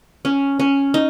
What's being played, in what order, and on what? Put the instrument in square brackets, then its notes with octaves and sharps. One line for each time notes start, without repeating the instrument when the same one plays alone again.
[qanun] C#4
C#4
D#4